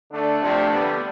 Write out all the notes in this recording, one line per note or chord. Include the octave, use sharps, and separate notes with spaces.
D3 A3 D4
C3 F3 A3
D3 G3 B3